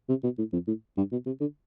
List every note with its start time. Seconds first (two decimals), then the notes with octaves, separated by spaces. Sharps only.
0.09 C3
0.23 B2
0.38 A2
0.53 F2
0.67 A2
0.97 G2
1.12 B2
1.26 C3
1.40 D3